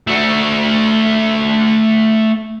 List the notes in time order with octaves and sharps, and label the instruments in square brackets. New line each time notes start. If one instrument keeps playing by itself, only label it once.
[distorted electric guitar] A3 F#4